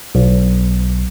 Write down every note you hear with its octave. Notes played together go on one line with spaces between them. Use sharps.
B1